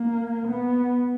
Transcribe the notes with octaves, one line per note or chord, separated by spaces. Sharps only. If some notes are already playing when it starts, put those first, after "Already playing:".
Already playing: A#3
B3